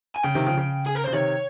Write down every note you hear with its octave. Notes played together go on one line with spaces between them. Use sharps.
G#5
C#3 G5
C3 D#3
C#3 F3
C#3
G#4
A#4
C#3 C5
C3 D#3 C#5